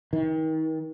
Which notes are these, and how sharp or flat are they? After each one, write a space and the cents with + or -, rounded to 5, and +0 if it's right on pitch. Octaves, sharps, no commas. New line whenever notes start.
D#3 +35